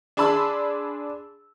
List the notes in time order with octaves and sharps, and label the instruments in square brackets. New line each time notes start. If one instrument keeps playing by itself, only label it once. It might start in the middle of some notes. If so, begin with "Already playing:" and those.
[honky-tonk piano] D4 G#4 A5 B5 C6 E6